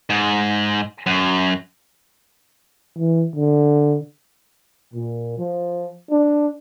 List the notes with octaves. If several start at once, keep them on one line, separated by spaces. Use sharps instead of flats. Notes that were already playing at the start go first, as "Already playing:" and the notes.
G#2
F#2
E3
D3
A#2
F3
D4